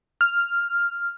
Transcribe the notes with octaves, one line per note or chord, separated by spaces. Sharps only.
F6